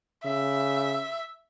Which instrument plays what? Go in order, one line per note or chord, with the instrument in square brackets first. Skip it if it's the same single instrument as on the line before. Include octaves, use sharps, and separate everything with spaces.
[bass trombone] C#3 [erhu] E5